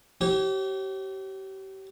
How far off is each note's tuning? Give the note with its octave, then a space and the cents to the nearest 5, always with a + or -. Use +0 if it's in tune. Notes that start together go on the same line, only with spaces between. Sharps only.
G4 -35 C#5 -40